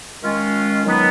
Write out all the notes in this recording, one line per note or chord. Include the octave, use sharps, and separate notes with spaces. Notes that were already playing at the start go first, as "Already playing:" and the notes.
D#3 G#3 C#4 F4
D#3 F#3 B3